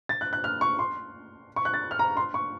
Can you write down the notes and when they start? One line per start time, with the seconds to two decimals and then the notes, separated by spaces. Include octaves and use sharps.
0.09 A6
0.21 F#6
0.33 F#6
0.44 F6
0.61 C#6
0.79 C6
1.56 C#6
1.65 F#6
1.74 A6
1.91 F6
1.99 A#5
2.17 C6
2.34 C#6